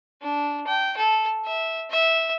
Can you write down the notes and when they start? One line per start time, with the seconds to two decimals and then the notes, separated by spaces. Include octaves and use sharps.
0.21 D4
0.67 G5
0.97 A4
1.45 E5
1.91 E5